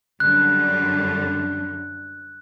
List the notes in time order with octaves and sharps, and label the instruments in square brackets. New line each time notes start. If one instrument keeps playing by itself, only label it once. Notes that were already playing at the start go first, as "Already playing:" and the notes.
[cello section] F#2 D3 G3 [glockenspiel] F#6